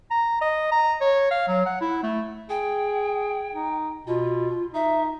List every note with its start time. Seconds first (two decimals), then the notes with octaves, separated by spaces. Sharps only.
0.11 A#5
0.41 D#5
0.72 A#5
1.01 C#5
1.31 F5
1.48 F#3
1.66 F#5
1.81 E4
2.03 A3
2.50 G#4 G5
3.54 D#4
4.07 B2 F4
4.74 D#4 E5